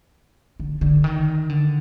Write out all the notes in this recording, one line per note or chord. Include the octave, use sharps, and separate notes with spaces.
D3
D3
D#3
D3